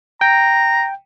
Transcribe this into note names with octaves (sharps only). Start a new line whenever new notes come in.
G5 A#5